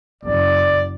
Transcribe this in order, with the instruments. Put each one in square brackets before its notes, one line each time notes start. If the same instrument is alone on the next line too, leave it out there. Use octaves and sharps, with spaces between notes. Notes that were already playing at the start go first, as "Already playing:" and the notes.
[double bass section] F#1 [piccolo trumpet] D5